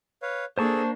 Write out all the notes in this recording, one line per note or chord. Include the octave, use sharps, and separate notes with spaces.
B4 C#5 F5
A#3 D4 G#4 A4 C5 A5 C#6